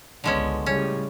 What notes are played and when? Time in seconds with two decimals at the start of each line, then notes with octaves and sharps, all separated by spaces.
0.24 G#1 C#2 D3 G#3 B3 C#4
0.66 A2 C#3 G3 C#4